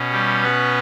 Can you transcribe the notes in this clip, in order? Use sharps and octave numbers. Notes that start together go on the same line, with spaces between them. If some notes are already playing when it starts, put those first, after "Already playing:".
Already playing: B2 C#4
G3 G4
B3 B4